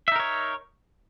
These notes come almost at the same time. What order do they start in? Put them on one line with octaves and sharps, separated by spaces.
E5 D#4 A#4 C#5